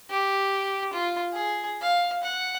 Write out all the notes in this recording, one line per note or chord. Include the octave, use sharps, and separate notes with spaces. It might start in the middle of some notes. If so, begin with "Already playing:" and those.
G4
F4
G#4
F5
F#5